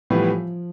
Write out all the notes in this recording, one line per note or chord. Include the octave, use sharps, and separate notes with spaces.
A2 E3 F3 G3 B3